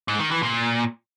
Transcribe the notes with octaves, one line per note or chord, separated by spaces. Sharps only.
G#2
D#3
E3
A#2